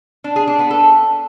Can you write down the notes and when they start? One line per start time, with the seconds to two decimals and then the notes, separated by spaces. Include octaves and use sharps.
0.24 D4
0.36 G#4
0.47 D4
0.59 B3
0.71 A4